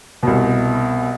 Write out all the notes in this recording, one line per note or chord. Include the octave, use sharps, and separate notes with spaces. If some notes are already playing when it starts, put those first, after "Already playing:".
C2 B2